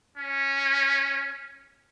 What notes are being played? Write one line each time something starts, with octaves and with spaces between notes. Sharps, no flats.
C#4